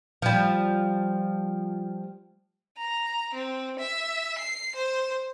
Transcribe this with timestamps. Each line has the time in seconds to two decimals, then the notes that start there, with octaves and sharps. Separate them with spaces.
0.22 F3 G3
2.78 A#5
3.34 C4
3.79 E5
4.38 C7
4.75 C5